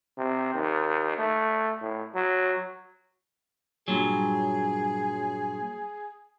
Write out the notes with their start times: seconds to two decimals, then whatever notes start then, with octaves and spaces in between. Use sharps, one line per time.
0.17 C3
0.54 D#2
1.18 A3
1.82 A2
2.15 F#3
3.88 G2 A#2 F#3 G#4